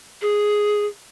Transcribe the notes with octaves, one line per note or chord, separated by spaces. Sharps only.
G#4